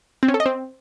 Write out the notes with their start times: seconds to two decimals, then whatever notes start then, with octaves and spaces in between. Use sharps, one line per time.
0.23 C4
0.28 C#4
0.34 A4
0.40 D#5
0.46 C4